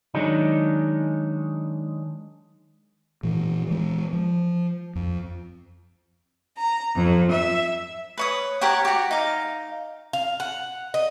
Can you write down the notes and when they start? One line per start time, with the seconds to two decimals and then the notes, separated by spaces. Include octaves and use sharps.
0.14 D#3 F#3 G#3 D4 D#4
3.23 A#2 E3
3.67 E3 G#3
4.13 F3
4.95 F2
6.57 A#5
6.95 F2
7.30 E5
8.18 B4 C#5 D#6
8.61 G4 A#4 C#5 F#5
8.85 F#4 G4
9.11 D#4 F5
10.13 F5
10.40 F#5
10.94 D#5